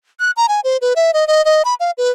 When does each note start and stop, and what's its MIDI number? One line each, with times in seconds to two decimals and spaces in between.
0.20 0.31 90
0.37 0.46 82
0.49 0.60 80
0.64 0.77 72
0.81 0.93 71
0.96 1.11 76
1.14 1.27 75
1.28 1.44 75
1.45 1.62 75
1.65 1.74 83
1.80 1.91 77
1.98 2.11 71